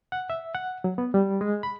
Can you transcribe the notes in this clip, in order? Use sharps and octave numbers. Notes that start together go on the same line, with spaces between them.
F#5
E5
F#5
F#3
B3
G3
G#3
B5